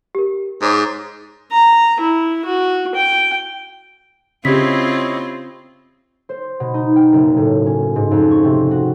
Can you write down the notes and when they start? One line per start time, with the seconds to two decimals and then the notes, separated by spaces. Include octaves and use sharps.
0.15 G4 A#4
0.61 G#2 G#4 C#5 D6
1.52 A#5
2.00 E4
2.45 F#4
2.95 G5
4.45 C#3 C4 E4 F4 G4 C#5 D#5 B6
6.29 C5
6.60 B2
6.74 D#4
6.96 G5
7.13 F#1
7.37 A2
7.66 C#4
7.96 G#2
8.11 F2
8.31 C#6
8.44 C3
8.71 F#4